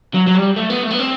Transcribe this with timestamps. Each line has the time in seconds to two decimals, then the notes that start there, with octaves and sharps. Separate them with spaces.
0.14 F#3
0.27 F#3
0.35 G3
0.57 A3
0.70 B3
0.83 A3
0.91 B3
0.99 C4